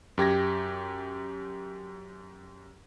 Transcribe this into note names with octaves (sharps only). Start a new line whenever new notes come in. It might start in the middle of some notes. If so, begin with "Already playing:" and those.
F#2 G4 G#6 A#6